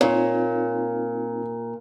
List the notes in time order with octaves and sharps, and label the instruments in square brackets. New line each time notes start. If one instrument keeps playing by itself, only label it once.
[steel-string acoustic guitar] A#2 [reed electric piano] C4 D#4 F4 [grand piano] C#5